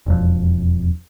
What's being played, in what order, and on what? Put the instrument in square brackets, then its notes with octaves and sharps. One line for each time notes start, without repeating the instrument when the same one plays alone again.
[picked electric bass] E1 F2